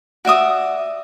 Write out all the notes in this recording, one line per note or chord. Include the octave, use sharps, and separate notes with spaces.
F#4 D5 E5 D#6